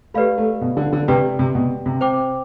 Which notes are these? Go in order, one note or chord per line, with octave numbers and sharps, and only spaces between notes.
A3 G4 B4 D5 F5 B5
A3
B2
D3
D3
C3 G4 B4 D5 G5
C3
B2
C3
C5 G5 D6